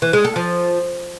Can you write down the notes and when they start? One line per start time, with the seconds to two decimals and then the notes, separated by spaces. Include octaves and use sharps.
0.02 E3
0.13 G#3
0.25 A4
0.36 F3